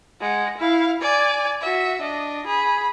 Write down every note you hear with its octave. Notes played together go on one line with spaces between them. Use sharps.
G#3 F#5
E4 F5
D5 G#5
F#4 E5
D4 D#5
G#4 B5